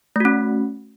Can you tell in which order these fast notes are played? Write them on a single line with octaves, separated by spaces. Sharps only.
A3 F#4 C#4